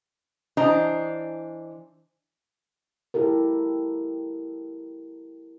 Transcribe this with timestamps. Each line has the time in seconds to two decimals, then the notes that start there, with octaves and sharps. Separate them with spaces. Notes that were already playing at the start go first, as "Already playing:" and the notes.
0.57 E3 D4 C5 D#5 A#5
3.14 E4 G4 A4 A#4